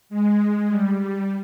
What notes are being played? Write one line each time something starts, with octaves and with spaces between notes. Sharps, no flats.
G#3
G3
G3